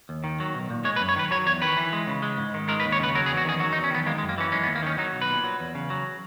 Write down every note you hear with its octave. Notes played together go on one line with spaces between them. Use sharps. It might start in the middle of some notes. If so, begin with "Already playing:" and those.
D#2
D#3
F#3
B1
A#2
G#3 C#5
B4
F#2
C#5
D#3 B4
F#3 C#5
E2 C#5
D#3 B4
E3
G#3
C#3
G#3
G#2
D#3
G#3 A#4
B4
D#2
C#5
C#3 B4
F#3 A#4
G#4
E2
F#4
D#3 G#4
F#3 F#4
D#4
E2
C#4
D#3 B3
G#3 A#3
G#3
F#2
A#3
E3 C#4
G#3 C#4
B3
D#2
A#3
D#3 C#4
F#3 D#4
B1
B4
A#2
F#3
E2
C#3
F#3